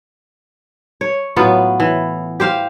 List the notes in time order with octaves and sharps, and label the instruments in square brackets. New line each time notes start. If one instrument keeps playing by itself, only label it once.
[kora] C#5
A2 F#3 B3 F4
E3
G4 C5 F5